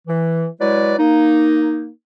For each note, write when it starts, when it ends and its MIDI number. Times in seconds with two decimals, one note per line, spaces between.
0.07 0.46 52
0.59 0.94 54
0.59 0.94 56
0.59 0.94 64
0.59 0.94 71
0.59 0.94 74
0.98 1.88 58
0.98 1.88 63